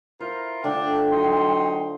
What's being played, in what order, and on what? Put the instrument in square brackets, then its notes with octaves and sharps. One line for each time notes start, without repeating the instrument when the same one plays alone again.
[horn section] E4 F4 A#4 [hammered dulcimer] C5
[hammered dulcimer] D3 A3 F4 [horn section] D4 [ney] G5
[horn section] F#3 D#4 C6